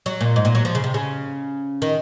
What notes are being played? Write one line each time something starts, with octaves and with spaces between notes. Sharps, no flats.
F#3
A#2
G#2
A#2
F#3
F3
C#3
C3
C#3
D#3